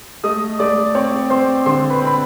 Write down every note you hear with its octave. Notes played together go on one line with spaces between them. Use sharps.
A3 D#5 D#6
A3 D5 D6
C4 C#5 C#6
C4 C5 C6
D3 C5 C6
B4 B5
C4 B5